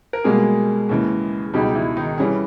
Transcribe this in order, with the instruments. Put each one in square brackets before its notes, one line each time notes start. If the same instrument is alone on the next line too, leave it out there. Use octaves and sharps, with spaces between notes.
[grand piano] A#4
[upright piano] B2 G3 A#3 [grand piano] G#3 G#4
[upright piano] D#2 C#3 E3
[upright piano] C#2 B2 G#3 D#4 [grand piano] G3 G4
[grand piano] E3 E4
D#3 D#4
[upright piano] E3 G3 C#4 G#4